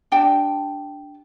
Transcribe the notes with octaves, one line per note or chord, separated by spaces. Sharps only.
D4 G4 G5 A5